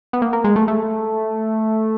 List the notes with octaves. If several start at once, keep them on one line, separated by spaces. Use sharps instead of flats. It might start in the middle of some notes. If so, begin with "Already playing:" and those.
B3
A#3
A#3
G#3
A3
A3